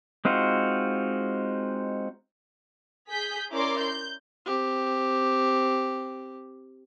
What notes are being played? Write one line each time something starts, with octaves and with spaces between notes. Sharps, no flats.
G#3 C4 D#4 F4 F#4
G#4 G6 B6
C#4 E4 A#4 D5 C6 D6
G6
C4 G4